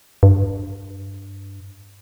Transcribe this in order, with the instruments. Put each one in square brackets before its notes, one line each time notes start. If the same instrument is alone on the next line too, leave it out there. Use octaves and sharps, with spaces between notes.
[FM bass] G2